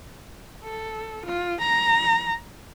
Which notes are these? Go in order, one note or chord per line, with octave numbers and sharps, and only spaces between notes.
A4
F4
A#5